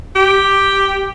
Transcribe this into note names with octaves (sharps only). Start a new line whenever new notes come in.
G4